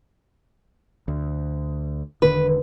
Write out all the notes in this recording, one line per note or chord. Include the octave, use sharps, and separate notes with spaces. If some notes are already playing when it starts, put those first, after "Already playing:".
D2
E1 D3 D#3 B4